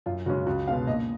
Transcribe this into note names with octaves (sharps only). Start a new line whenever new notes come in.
F#2 F4
C#3 G#3 C#4 F#4
C#2 F#4
B2 G#3 C#4 F5
A#2 D#5